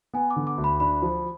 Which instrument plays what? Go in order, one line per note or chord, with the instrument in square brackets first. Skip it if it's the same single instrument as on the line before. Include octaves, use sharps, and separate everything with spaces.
[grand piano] B3 [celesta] G#5
[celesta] D6
[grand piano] D3
[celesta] D6
[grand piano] D2
[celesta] B5
[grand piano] D4 [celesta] B5
[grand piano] F3